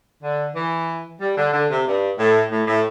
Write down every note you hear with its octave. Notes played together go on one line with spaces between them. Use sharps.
D3
E3
G3
D3
D3
C3
G2
A2
A2
A2